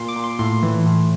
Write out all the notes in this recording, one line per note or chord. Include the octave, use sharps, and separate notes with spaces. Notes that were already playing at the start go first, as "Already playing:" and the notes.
Already playing: A#2 C6
D6
A#2
C6
A2 C6
E3
A2